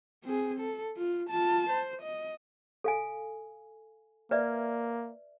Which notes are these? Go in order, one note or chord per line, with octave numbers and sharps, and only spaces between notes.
C4 G#4
A4
F4
F4 A5
C5
D#5
A4 F5 G#5
A#3 B4 D5 E5